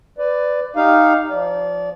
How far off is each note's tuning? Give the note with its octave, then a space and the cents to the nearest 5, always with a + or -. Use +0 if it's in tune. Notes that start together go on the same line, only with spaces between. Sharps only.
B4 +20 D5 +0
D#4 +0 G4 +0 F5 +0
F3 +0 D5 -30